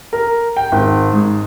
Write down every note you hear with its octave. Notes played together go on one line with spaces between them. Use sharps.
A#4
G5
G#1
G#2